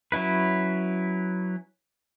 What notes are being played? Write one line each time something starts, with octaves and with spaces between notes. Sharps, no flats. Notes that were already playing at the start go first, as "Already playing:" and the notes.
F#3 C#4 E4 B4